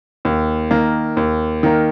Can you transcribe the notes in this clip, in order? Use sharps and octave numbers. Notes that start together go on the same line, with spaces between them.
D#2
D#3 A#3
D#2
D#3 A#3